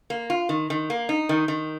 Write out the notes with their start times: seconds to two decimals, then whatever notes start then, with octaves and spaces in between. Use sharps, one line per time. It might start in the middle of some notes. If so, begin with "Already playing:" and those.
0.10 A#3
0.30 F4
0.49 D#3
0.70 D#3
0.90 A#3
1.09 D#4
1.29 D#3
1.48 D#3